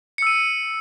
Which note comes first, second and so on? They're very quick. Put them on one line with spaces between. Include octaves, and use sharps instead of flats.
C#7 E6 D#7